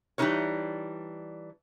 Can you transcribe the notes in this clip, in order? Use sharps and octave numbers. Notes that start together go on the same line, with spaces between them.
E3 G3 D4 D#4 A#4 C#5